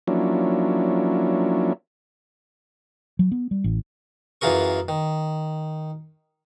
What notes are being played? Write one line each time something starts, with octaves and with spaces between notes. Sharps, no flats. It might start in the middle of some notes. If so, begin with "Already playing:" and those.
F3 F#3 A#3 C#4 D4 E4
F#3
B3
G3
A1
F#2 E3 F4 G#4 A#4 C#6
D#3